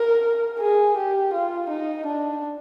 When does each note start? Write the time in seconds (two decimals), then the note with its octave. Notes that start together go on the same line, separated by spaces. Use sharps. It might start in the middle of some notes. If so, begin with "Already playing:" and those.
Already playing: A#4
0.60 G#4
0.97 G4
1.33 F4
1.70 D#4
2.06 D4